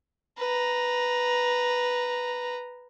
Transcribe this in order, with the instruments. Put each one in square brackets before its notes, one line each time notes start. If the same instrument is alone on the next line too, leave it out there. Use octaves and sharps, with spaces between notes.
[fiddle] B4 A#5